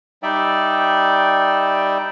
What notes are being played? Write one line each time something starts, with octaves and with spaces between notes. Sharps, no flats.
G3 D#4 D5 E5 G5